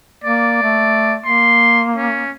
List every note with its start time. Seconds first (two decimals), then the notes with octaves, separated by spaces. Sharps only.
0.24 A#3 D5
0.63 A3
1.25 A#3 C6
1.96 C#4